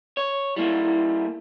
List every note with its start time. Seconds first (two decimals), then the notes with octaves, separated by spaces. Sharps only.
0.17 C#5
0.56 G3 A#3 E4